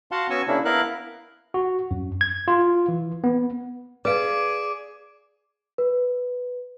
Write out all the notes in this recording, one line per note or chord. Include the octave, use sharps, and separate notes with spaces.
F#4 F5 F#5 A5 C6
B3 C#4 F#4 G#5 C#6 E6
C#3 A#3 C#4 D4 E4
B3 E4 A#4 F5 F#6
F#4
F#2
G#6
F4
E3
B3
G#4 B4 D5 F5 D6 D7
B4